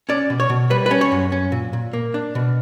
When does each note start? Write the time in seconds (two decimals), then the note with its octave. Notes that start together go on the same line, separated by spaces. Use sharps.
0.09 C#4 D5
0.30 B2
0.40 C#5
0.50 B2
0.70 G3 B4
0.86 B4
0.91 C#4
1.01 C#5
1.12 F#2
1.32 C#4
1.52 A#2
1.73 A#2
1.93 A#3
2.14 D4
2.35 B2